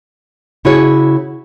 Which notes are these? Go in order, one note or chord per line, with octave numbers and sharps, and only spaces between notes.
C#3 E4 F#4 G#4 C#5